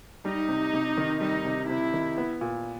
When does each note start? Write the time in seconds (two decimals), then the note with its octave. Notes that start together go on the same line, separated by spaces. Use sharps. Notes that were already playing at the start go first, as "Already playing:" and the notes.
0.25 G3 D#4
0.48 C3
0.73 C3
0.97 D#3
1.20 G3 D#4
1.45 C3
1.68 C3 E4
1.94 D#3
2.18 B3
2.41 A#2